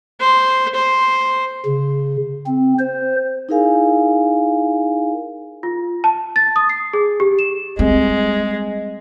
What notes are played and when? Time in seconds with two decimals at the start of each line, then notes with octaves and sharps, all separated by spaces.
0.21 C5
0.75 C5
1.65 C#3
2.47 C4
2.79 C5
3.49 D#4 E4 G#4 A#4 F5 G#5
5.63 F4
6.04 A5
6.36 A6
6.56 D#6
6.69 C7
6.93 G#4
7.20 G4
7.39 E7
7.79 G3 G#3 C4